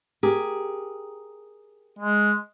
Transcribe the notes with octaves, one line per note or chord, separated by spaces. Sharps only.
G4 G#4 A#4
G#3